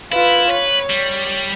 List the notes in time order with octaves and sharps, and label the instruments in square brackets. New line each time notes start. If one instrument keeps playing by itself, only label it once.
[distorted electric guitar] E4 [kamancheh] F4 B4
[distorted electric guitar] B4 [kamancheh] C#5
[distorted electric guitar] G3